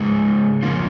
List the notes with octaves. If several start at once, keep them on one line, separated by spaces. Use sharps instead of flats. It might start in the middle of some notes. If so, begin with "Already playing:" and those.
Already playing: C#3 G#3 D#4 G#4
C#3 F3 A#3 C#4 F4